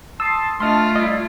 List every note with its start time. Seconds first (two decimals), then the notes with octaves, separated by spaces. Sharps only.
0.20 A5 C6 D#6 E6
0.60 A3 D4 F4 D#5 A5 C6 F6
0.96 G3 E4 D#5